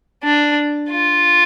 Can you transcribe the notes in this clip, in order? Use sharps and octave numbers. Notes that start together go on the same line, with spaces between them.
D4
F4